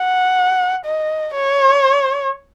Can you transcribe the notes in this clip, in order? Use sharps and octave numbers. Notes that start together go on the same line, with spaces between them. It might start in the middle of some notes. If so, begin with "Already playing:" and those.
Already playing: F#5
D#5
C#5